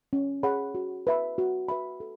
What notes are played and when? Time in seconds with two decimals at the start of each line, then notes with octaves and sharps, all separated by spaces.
0.13 C#4
0.43 G#4 C#5 F#5 B5
0.75 F#4
1.07 B4 E5 B5
1.38 F#4
1.68 B4 E5 B5
2.00 A4